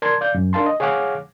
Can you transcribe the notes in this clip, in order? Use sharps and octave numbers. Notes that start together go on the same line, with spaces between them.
A#4 D5 A5 C6 G#6
D5 F5 G6
F#2
D4 A#4 F5 A5 C6
D#5
G#4 C#5 F5 F#5 D6 F6